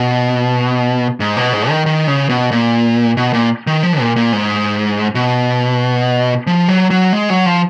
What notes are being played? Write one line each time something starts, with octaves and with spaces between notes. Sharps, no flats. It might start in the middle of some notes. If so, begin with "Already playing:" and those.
Already playing: B2
G#2
B2
G#2
D#3
D#3
C#3
B2
A#2
B2
A#2
D#3
F3
A#2
A#2
G#2
B2
F3
F#3
F#3
G#3
F#3
F3